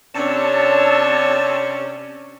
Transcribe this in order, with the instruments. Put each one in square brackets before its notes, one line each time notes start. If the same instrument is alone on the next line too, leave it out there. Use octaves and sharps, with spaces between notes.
[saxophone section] C3 C#4 [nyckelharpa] D4 C#5 [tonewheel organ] A5 E6